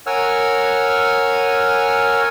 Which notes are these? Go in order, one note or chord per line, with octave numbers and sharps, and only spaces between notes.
A#4 C#5 F#5 G#5 E6 F6